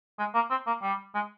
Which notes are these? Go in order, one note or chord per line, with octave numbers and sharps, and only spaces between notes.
G#3
A#3
C4
A#3
G3
G#3